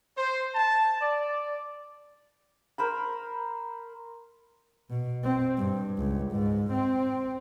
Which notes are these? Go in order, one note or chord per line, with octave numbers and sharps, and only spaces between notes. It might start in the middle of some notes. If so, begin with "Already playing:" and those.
C5
A5
D5
A#4 C5 B5
B2
C4
G2
C#2
G#2
C4